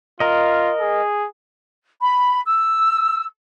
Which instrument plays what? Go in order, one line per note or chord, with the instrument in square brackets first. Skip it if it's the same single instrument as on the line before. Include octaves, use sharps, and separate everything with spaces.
[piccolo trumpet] F4 [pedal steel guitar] A#4 D#5
[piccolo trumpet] G#4
[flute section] B5
E6